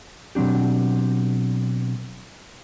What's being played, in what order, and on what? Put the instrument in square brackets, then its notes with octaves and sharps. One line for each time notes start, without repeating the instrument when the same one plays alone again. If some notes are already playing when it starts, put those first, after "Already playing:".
[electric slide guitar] B2 F#3 C4 D4 G4